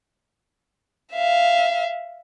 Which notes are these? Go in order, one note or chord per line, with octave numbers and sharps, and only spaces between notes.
E5 F5